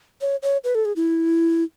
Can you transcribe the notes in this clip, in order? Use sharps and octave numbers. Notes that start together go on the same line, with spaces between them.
C#5
C#5
B4
A4
G#4
E4